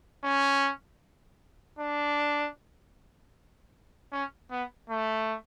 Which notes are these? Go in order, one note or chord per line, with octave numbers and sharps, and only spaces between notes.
C#4
D4
C#4
B3
A3